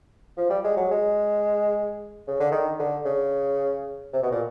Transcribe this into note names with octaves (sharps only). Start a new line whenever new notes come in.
F3
G3
G#3
F#3
G#3
C#3
D3
D#3
D3
C#3
C3
B2
A#2